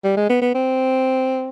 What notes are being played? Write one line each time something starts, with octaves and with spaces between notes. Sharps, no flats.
G3
G#3
B3
B3
C4